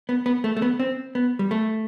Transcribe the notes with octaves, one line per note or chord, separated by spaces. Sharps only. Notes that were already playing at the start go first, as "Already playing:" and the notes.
B3
B3
A3
A3
B3
C4
B3
G3
A3